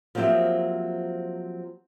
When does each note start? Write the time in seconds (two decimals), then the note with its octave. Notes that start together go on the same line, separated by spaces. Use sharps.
0.15 F3 F#3 A#3 C4 G4 E5